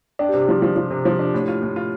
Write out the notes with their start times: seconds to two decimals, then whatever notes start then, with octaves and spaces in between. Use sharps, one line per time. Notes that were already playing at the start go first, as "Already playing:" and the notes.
0.19 D4 D5 G5
0.29 G4
0.33 C3
0.39 G4
0.49 F3 F4
0.62 F3
0.76 F3
0.91 C3
1.05 F3 G4
1.19 D4
1.34 A2
1.48 F4
1.62 A2
1.76 F4